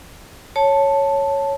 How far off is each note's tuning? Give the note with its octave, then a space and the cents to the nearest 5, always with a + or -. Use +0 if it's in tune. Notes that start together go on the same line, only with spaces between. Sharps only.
C#5 +0 A5 +0